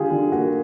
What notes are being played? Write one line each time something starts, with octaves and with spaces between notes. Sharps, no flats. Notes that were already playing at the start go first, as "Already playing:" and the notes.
Already playing: D3 G3 F4 G4 G#4
D3
A#3 F#4